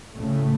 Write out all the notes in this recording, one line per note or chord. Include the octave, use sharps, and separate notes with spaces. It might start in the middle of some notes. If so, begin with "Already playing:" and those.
D2 A2 C#3 A3